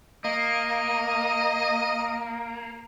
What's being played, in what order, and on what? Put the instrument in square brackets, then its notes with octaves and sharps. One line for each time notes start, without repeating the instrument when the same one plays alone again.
[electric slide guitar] A#3 [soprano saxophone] D#5